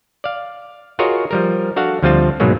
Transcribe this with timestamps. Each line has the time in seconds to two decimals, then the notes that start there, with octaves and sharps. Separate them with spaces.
0.24 D5 F5
0.99 F4 F#4 G#4 A#4 C#5 D#5
1.31 F3 G3 A#4
1.76 D4 F#4 A4 F5 F#5
2.02 D2 F3 G3 C4 F4 A5
2.40 G#2 B2 F#3 G#3 A#3